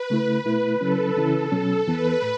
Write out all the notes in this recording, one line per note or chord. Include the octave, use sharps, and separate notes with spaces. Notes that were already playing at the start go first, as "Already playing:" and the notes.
Already playing: B4
C#3 A3 E4
B2 A3 E4
C#3 F#3 C#4 E4 A4
C#3 E3 C#4 E4 A4
B2 F#3 C#4
E2 E3 B3 B4
A2